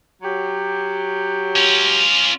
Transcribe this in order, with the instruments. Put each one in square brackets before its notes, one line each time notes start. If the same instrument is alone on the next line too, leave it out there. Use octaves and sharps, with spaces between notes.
[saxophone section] F#3 G4
[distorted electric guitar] C#4 F4